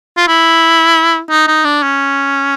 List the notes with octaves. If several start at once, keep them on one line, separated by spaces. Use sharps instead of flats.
F4
E4
D#4
D#4
D4
C#4